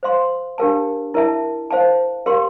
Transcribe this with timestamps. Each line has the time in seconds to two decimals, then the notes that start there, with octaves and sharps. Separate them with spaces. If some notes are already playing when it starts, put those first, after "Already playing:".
0.03 C5 F5 C6
0.58 D4 G4 A#4 F5 A5
1.14 E4 A#4 E5 A5
1.71 C5 F5 A5
2.26 G4 A#4 F5 C6